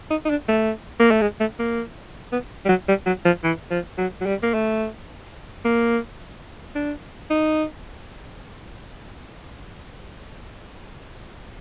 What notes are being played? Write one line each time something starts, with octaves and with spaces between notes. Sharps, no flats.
D#4
D#4
D4
A3
A#3
A3
G#3
A3
A#3
B3
G3
F#3
G3
F#3
F3
E3
F3
F#3
F#3
G3
A#3
A3
A#3
D4
D#4